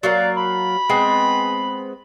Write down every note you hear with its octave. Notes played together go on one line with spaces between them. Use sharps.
F#3 A#3 A#4 D5
B5
G#3 B3 C4